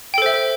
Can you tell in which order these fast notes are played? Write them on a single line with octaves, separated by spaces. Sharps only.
G5 A4 C5 E5